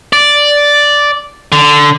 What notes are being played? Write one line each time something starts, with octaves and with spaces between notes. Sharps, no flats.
D5
D3